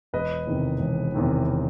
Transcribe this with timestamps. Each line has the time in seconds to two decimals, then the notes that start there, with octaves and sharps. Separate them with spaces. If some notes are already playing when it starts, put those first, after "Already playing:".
0.13 E1 B4 D#5
0.47 E2 C3 D#3
0.80 E1
1.14 E2 C3 D#3